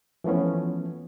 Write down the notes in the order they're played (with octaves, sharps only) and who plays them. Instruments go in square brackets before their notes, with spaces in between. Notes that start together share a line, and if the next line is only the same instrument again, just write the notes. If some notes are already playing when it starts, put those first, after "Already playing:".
[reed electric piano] E3 F3 A3 B3 C#4